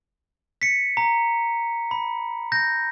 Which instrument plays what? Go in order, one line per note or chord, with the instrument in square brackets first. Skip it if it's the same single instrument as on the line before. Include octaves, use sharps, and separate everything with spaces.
[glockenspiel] B6 C#7
A#5
B5
G6 A#6